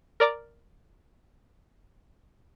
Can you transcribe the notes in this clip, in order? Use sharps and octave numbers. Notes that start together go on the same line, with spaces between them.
A#4 D5 A#5 D6